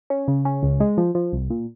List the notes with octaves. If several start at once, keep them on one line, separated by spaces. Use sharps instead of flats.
C#4
C#3
C#4
C#2
G#3
F3
F3
C2
A#2